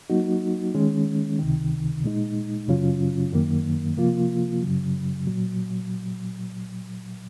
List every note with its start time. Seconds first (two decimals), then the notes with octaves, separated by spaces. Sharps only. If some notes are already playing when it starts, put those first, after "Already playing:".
0.10 F#3 A#3 D#4 F#4
0.75 D#3 G#3 C#4
1.39 C#2 C3 D#3
2.04 A#2 G#3 D#4
2.68 F#2 C#3 F#3 C#4 F4
3.33 F#2 D#3 A#3
3.97 C3 F3 A#3 F4
4.62 F#2 C#3 F#3
5.27 A#2 F#3